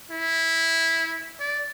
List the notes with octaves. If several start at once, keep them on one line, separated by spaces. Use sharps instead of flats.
E4
D5